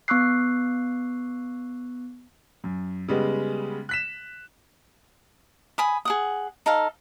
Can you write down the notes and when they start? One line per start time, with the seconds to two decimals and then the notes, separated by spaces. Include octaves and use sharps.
0.08 B3 C#6 D6 E6 F#6 C7
2.64 F#2
3.08 C#3 G3 G#3 B3
3.89 F#6 B6 E7
5.78 G#5 B5 D#6
6.05 G#4 F#5 D#6
6.66 D#4 A4 F5